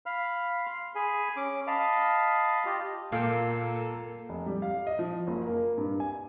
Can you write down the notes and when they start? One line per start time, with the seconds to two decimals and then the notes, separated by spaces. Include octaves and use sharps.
0.06 F5 B5 F6
0.66 C6
0.95 G#4 G#5 B5
1.37 C#4 D6
1.67 D#5 F5 A5 B5 F6
2.66 F4 G4 D#5
3.12 A#2 A#3 A4 F5 G5
4.29 F1
4.46 G3
4.62 F5
4.87 D#5
4.99 F3
5.27 F#1
5.47 A#3
5.78 G2
6.00 G#5